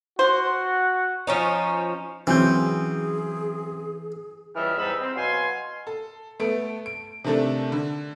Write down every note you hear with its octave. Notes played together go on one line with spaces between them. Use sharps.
F#4 C5
F3 C#4 D#4
C#3 E3 F#3 C4 C#4 G#4 G6
C#2 E3 G3 D#5 E5 F6
E2 G#2 G3 D#4 B5 E6
C4
B2 F#3 F5 G#5 C6
A4
A3 B3 A4 D7
D7
C3 D#3 A3 D4 A4
D3